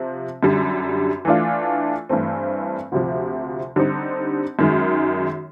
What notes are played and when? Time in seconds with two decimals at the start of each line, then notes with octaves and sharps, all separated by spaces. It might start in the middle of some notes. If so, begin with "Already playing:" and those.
Already playing: C3 F3 C4
0.43 F#2 D3 G3
1.25 E3 A3 D4 F4
2.09 G2 E3 A3 C4
2.92 D2 C3 F3
3.76 D3 G3 C4 D#4
4.59 F#2 D#3 G#3